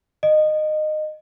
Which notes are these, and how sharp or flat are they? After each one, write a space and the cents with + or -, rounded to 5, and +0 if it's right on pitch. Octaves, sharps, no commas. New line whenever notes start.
D#5 -20